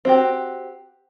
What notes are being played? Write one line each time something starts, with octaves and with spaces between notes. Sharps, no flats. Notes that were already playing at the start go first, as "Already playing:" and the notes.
C4 F#4 G4